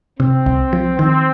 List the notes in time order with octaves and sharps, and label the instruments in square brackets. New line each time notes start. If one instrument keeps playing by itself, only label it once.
[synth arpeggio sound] C3 [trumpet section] C4
[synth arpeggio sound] C2
F3
[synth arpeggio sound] D#3 [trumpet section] C4